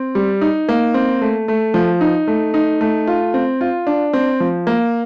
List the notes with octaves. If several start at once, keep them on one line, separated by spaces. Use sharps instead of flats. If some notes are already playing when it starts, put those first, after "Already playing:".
Already playing: C4
G3
D#4
A#3
C4
A3
A3
F3
D#4
A3
D#4
A3
F4
C4
F4
D4
C4
F3
A#3